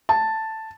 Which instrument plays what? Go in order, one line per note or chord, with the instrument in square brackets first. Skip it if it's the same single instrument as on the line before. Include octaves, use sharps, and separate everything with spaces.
[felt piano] A5